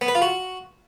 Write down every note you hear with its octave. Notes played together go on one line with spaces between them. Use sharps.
B3
B4
F4
F#4